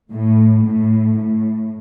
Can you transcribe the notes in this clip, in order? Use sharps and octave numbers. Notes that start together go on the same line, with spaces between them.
A2
A2
A2